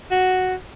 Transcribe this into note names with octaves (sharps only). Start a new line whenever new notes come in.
F#4